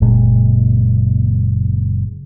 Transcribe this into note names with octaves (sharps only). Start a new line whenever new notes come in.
F#1 A#2 G#3